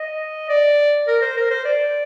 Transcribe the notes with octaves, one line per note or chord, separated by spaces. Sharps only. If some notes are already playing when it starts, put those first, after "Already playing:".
Already playing: D#5
D5
A#4
C5
A#4
C5
D5